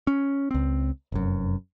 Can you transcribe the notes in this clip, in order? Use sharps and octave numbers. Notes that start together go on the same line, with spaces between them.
C#4
C#2 C4
F1 F#2